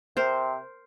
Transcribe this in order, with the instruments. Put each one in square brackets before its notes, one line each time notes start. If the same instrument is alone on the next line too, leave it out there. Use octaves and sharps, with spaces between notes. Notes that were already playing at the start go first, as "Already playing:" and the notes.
[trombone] C3 [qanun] A#4 C5